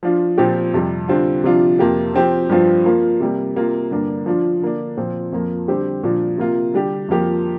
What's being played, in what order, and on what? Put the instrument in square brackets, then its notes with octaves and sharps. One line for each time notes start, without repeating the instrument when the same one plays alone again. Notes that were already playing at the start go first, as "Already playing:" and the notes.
[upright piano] F3 D4 F4
A#2 F3 C4 G4
F2 C3 G3
D3 G3 C4 F4
C3 F3 D4 F4
F2 C3 A#3 G4
F3 C4 G4
G2 F3 C4 F4
F3 A#3 F4
C3 G3 A#3
C3 A#3 F4
G2 D3 A#3 D4
F3 D4 F4
D3 A#3 D4
A#2 F3 C4
F2 F3 A#3
D3 G3 C4 G4
A#2 F3 D4
C3 A#3 F4
D3 G3 D4 G4
F2 F3 A#3 G4